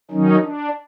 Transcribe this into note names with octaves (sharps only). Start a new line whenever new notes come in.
D#3 F#3 C#4 D#4
D4